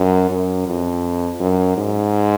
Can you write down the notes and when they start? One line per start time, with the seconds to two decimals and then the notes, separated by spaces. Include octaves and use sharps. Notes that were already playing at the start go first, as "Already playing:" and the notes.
Already playing: F#2
0.30 F#2
0.67 F2
1.40 F#2
1.77 G#2